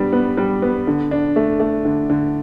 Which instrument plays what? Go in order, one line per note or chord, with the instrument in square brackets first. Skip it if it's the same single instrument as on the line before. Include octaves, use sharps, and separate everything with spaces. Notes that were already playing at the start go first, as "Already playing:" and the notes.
Already playing: [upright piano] G3 B3 D4
B3
G3
B3
D3
D4
A3
A3
D3
D3